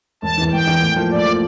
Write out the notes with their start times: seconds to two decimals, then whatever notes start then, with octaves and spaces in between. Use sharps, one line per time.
0.22 E1 A5
0.38 E2 E3
0.52 E1 G5
0.67 E2 E3
0.82 A2
0.96 F3 A#3 F4
1.11 A2 D5
1.26 F3 A#3 F4